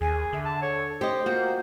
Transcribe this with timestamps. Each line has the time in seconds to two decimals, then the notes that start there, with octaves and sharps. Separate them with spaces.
0.01 D#2 G#4 G#5
0.33 D3 E5
0.45 A5
0.62 A4 C#5
1.01 G4 C5 D#5 C6
1.26 A#3 F4 F#4 G6